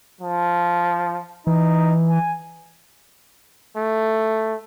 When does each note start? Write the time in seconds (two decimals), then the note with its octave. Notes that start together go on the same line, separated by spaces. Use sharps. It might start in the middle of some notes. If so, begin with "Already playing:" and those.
0.21 F3
1.47 E3 D#4
2.10 G#5
3.76 A3